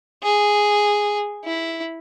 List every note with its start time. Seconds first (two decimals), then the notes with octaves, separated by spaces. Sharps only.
0.23 G#4
1.45 E4